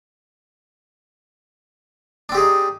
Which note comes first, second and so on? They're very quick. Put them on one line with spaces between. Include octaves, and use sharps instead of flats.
D4 C4 G4 G#4 D#4